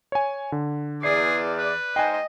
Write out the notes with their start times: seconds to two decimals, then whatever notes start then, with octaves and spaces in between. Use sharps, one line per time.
0.12 C#5 G#5
0.52 D3
1.03 E2 G#4 D5 C7
1.58 B4
1.96 G#2 C5 D#5 G5 G#5